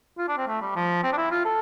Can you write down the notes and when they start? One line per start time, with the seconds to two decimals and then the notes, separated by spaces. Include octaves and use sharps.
0.18 F4
0.28 D4
0.38 C4
0.48 A3
0.61 G3
0.76 F3
1.04 C4
1.13 D4
1.17 E4
1.31 F4
1.45 A4